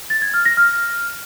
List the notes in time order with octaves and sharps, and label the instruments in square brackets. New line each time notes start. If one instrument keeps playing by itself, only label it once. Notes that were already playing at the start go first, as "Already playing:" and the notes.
[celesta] A6
G#6
F6
A#6
F6